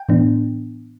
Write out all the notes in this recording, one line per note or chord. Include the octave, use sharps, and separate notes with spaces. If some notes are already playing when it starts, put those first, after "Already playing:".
Already playing: G5
A2 E3 B3 D4